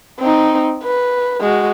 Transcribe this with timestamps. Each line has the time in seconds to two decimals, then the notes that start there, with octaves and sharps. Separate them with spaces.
0.20 C4 D#4
0.83 B4
1.41 G#3 F#4